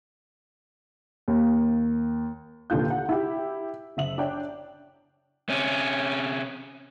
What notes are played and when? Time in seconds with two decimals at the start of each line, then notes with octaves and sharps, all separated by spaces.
1.28 D#2
2.70 F1 D#2 A#2 D3 F4 G6
2.90 F#5
3.09 E4 G4
3.97 F#1 E5 F#7
4.18 D4 C#5 G5
5.49 C3 C#4